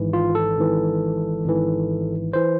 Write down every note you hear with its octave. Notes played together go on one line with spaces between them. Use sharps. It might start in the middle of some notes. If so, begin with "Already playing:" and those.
Already playing: G#1 G#2 E3
F4
A4
G#1 G#2 E3
G#1 G#2 E3
E3 C5